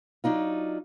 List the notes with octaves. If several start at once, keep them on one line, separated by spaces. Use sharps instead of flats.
F#3 D4 D#4 F4